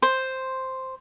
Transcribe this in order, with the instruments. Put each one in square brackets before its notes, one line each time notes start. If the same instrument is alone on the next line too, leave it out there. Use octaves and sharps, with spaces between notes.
[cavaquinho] C5